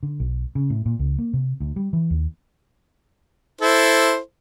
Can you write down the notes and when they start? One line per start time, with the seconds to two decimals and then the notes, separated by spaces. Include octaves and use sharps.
0.03 D3
0.20 B1
0.55 C#3
0.70 A2
0.86 A#2
0.99 C#2
1.18 A#3
1.33 C3
1.60 D2
1.76 G3
1.93 E3
2.10 D#2
3.61 E4 A4 C5